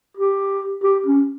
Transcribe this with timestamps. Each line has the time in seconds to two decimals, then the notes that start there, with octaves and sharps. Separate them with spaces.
0.17 G4
0.84 G4
1.06 C#4